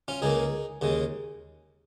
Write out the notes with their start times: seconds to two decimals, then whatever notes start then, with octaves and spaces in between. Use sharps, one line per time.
0.08 C#4 F4
0.22 C#2 C#3 A#3 D#4 G#4
0.81 D#2 C#3 G#3